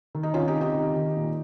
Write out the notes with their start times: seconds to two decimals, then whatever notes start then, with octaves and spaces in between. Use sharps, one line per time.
0.15 D#3
0.23 D#4
0.34 C3 C#4 F4
0.48 D#4 G4
0.55 C3
0.61 D#4 G4
0.75 D#3
0.96 D#3
1.16 A#2